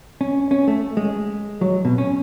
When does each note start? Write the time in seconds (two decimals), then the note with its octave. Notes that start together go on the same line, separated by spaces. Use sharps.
0.21 C#4
0.51 C#4
0.68 A3
0.97 G#3
1.61 F#3
1.85 B2
1.98 C#4